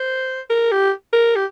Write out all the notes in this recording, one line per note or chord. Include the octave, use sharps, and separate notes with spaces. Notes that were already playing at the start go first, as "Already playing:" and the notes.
Already playing: C5
A#4
G4
A#4
G4